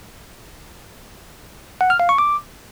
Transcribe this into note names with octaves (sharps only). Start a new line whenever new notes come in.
F#5
F6
F5
C#6
D6